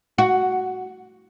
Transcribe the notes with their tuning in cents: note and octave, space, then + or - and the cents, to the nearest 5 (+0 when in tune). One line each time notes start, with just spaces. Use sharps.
F#4 +5